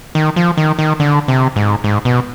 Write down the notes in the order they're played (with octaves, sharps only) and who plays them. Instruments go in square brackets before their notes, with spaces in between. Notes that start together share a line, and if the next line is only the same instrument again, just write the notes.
[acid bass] D#3
F3
D#3
D#3
D3
C3
G#2
G#2
B2